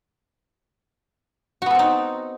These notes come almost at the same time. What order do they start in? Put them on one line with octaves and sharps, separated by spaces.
F#4 B3 A4 C4 D#4